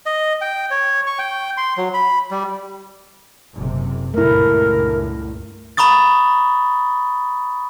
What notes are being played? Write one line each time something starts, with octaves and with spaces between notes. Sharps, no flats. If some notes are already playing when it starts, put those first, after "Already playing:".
D#5
G5
C#5
C#6
G5
C6
F#3
B5
G3
F#1 C3
C#2 G2 A#2 A3 E4 A#4
A#5 B5 C#6 D#6 A6